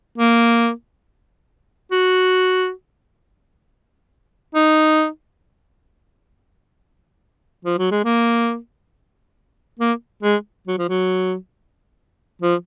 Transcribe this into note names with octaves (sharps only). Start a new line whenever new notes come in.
A#3
F#4
D#4
F3
F#3
G#3
A#3
A#3
G#3
F#3
F3
F#3
F3